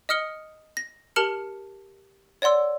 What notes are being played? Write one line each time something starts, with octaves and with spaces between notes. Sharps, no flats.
D#5 D#6 F6 C#7 G7
A#6
G4 A#4 A5 F6 C#7 F#7
C#5 D5 F#5 C6 E6